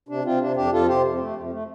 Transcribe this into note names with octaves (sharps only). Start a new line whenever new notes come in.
C3 D4
C3 C4 F4
C3 D4
F2 D4 G4
F2 F4 A4
C3 G4 C5
F2
A3
F2
A3